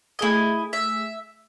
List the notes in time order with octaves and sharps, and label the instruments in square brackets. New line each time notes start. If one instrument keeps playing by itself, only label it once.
[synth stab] A3 G#4 G#6 [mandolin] E4 D#5
[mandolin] E5